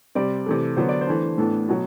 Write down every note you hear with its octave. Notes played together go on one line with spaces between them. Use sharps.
C3 G3 C4 D5
C3 E3 A3
D3 F#3 B3 C5
D5
C5
E3 A3 D4
A2 E3 B3 D4 A4
B2 F#3